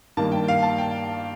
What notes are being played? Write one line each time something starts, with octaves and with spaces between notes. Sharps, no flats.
G2 D#3 A#3 A5
G5
F5
A5
G5